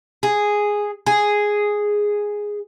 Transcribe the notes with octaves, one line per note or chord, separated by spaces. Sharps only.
G#4
G#4